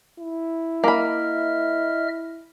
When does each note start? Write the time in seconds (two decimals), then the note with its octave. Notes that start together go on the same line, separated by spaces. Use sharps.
0.20 E4
0.84 A#3 D#5 E5 B5 F6